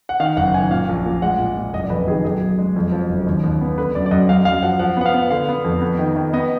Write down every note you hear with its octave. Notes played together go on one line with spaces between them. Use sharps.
F#5
D#3 F5
F#1 F#5
D#3 G#5
A#2 F5
A#1
A#2
G#3 F#5
A#2
A#2
F#1 D#5
D5
F2 B4
D#3 G#4
B1 G#4
B1
G#3
F2
F3
F#1
D#2
D#2
B3
D3 B4
F#2 D5
D5
F#2 D#5
F#2 F5
F#2 F5
F3 F#5
F3 F#5
B3 F#5
F5
B3
D3 F5
B3
F2
B3
D#3
D#3
B3 D#5